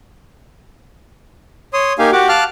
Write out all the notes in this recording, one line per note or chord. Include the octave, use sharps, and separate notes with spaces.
C#5 C6 D#6
A#3 D#4 G4 F5 G#5
F#4 G4 F#5 D6
F5 A5 D6 F6 F#6